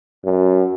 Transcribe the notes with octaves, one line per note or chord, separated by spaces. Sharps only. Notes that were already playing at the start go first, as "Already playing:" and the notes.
F#2